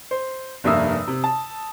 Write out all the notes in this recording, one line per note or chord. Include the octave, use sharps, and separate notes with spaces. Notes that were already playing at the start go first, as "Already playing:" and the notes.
C5
F1 G2 A#3 E5 D#6 E6
C3
A5